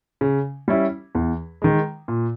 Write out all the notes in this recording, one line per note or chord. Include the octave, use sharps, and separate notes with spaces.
C#3
G3 C#4 E4
E2
D#3 G#3
A#2